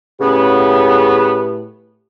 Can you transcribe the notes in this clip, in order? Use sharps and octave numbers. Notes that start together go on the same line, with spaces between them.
A2 C#3 B3 G4 B4